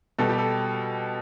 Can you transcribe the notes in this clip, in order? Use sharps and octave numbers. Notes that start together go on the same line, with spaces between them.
B2 G3 A4
G4
A4